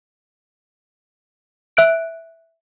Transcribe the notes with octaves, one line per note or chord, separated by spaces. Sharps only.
E5 F#6 D7